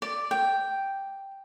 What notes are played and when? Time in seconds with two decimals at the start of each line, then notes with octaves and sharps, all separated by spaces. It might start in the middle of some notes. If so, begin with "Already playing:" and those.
0.02 D5
0.31 G5